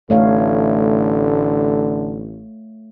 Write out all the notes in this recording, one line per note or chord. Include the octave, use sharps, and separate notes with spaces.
A1 D3 A3 C#5 F5